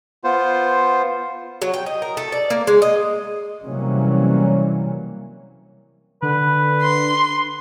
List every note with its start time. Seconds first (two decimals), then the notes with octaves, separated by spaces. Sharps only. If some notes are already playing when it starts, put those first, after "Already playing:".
0.24 B3 F4 C5
1.62 F#3
1.73 G5
1.86 D#5
2.02 A#4
2.17 A3
2.32 D5
2.50 A#3
2.67 G#3
2.82 D#5
3.65 C3 E3 F#3 G3 A#3 C#4
6.22 D3 B4
6.83 C6